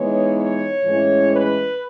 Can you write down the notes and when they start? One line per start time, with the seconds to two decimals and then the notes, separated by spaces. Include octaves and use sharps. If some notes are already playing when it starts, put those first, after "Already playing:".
Already playing: E3 G#3 B3 D#4 C#5
0.35 C#5
0.83 A2 E3 G#3 C#4
1.31 B4